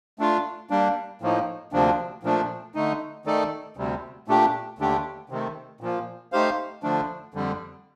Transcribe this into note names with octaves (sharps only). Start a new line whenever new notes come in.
A3 D4 F4
G3 A#3 D4
A2 F3 A#3 D#4
D2 C3 F3 A#3 D4
A#2 F3 A3 D4
D3 A3 D#4
D#3 A3 D#4 A4 D5
D2 C3 G3
A#2 A3 D4 G4
D#2 D3 A3 D4 G4
C3 D#3 A3
A#2 F3 A#3
A3 D#4 G4 C5 F5
D3 F3 A3 D4
F2 D3 G3